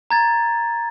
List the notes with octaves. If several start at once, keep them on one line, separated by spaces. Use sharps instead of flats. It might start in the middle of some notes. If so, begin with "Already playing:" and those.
A#5 G#6 A6